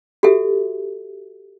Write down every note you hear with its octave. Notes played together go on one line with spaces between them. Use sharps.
F#4 G4 A4 E5